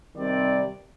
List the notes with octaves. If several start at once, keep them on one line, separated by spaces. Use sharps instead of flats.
C3 D#3 G3 C4 D5